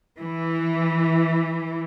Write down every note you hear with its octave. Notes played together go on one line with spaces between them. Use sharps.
E3